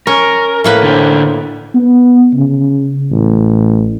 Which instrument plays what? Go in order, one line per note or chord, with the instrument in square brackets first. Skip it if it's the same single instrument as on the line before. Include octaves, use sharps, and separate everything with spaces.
[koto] C#4 [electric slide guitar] A#4
[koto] A2 A#3 B4
[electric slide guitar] D3 D4 C5
[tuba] B3
C#3
A1